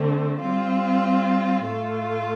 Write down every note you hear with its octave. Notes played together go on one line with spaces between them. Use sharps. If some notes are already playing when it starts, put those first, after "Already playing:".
Already playing: D3 A3 C4
G3 C4 F4
A2 A3 F4